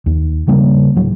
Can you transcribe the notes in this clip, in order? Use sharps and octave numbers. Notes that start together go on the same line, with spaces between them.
D#2
C#3 G3 A#3
D1 F#3